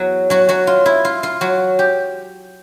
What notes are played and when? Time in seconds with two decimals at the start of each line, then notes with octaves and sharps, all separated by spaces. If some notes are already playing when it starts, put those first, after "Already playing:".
Already playing: E2 F#3 F#4
0.30 F#3 F#4
0.49 F#3 F#4
0.67 F4
0.86 E4
1.05 F4
1.23 F4
1.41 F#3 F#4
1.79 G4